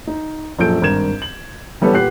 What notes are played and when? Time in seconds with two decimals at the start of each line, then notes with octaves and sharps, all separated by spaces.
0.07 D#4
0.59 A#1 F#2 A#2 A4 G6 D7
0.82 G#1 G2 A#4 G#6 E7
1.22 F#7
1.81 E3 G3 B3 G4 A4 C#5
1.93 A#2 G4 B4 F#5 F#6 C7